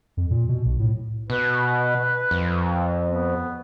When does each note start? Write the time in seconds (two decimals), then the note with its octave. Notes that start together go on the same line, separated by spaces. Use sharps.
0.17 F2
0.31 A#2
0.49 B2
0.65 B1
0.79 A2
1.30 B2 B4
2.31 F2
3.06 B3